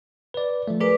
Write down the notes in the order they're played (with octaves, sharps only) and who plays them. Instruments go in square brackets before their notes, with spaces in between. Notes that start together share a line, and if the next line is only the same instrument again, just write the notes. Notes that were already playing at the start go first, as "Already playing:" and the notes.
[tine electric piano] B4 D5
F3 A3
[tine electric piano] G#4 A#4 [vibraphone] B4 D5 D6